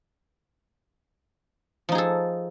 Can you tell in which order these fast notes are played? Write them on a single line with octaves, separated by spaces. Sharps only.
F3 D#4 G#4 A4